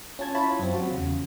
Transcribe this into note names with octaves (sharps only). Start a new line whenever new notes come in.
C#4 F4 A5 G#6
E4 F4 C#5 A5 B5
F#2 C4
F3 F#3 F4 F#4
E2 C#3